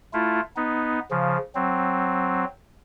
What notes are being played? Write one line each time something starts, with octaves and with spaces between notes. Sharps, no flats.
A3 E4 F4
B3 D#4
C#3 F3
F#3 C4